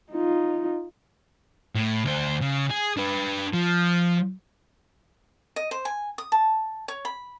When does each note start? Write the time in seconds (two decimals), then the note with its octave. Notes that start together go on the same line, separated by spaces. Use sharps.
0.11 D#4 F4
1.75 A2
2.05 D2 C5
2.41 C#3
2.71 G#4
2.97 D4 B4
3.53 F3
5.56 D#5
5.71 C5
5.85 G#5
6.18 D#6
6.32 A5
6.88 C#5
7.05 B5